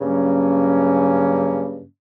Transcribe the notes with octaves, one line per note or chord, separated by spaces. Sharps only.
G2 C#3 F#3 A#3 C#4